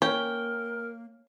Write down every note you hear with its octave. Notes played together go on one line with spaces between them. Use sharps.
A#3 C#4 A#4 G5